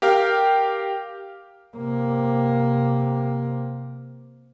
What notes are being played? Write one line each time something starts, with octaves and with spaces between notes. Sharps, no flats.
G4 A#4 F5 G5 F6
C3 A#3